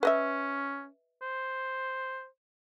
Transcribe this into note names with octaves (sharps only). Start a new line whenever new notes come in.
C#4 B4 D#5 E5
C5